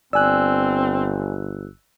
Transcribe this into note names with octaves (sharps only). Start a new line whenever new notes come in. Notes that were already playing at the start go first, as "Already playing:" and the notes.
G1 C4 D5 G#5 E6 F#6